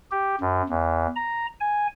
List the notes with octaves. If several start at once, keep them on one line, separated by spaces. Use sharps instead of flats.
G4
F#2
E2
A#5
G#5